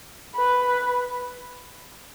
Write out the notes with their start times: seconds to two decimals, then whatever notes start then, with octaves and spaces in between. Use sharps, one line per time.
0.36 B4